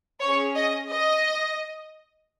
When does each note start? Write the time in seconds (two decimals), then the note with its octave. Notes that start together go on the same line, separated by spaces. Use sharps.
0.21 C#4 G#4 C#5
0.55 D#5
0.91 D#5